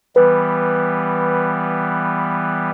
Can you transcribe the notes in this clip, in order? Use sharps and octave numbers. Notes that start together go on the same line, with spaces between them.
E3 G3 B3 B4